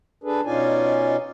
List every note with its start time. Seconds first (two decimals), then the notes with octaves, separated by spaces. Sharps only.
0.24 D4 G#4 A4 B4
0.45 B2 C#4 D#4 F4 D5 G#5